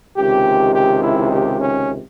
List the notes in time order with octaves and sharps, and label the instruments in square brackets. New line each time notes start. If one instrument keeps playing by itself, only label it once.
[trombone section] C#2 C3 D#3 G4
G4
E4
G4
C#4